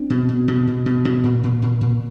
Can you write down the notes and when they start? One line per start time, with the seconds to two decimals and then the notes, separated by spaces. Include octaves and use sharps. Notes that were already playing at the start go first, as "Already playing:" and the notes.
Already playing: C4 D4
0.10 B2
0.29 B2
0.48 B2
0.67 B2
0.86 B2
1.05 B2
1.23 A#2
1.43 A#2
1.62 A#2
1.81 A#2